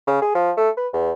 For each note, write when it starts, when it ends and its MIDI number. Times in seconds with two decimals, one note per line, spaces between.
0.07 0.19 49
0.22 0.32 68
0.35 0.51 53
0.57 0.69 57
0.77 0.88 71
0.93 1.12 40